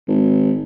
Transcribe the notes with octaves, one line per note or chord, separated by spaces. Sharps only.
G#1